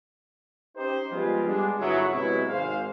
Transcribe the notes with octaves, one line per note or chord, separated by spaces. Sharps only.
C#4 D#4 G4 C5
F3 G3 G#3 B3 F4 G#4
G3 G#3 B3 D4
G1 F#3 B3 E4 G#4 E5
C3 F#3 G#3 B3 E4
G#1 G#2 C5 F5